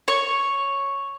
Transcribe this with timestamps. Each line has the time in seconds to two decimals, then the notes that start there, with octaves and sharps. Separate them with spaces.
0.08 C#5 C#6